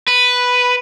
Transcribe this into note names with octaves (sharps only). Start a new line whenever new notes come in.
B4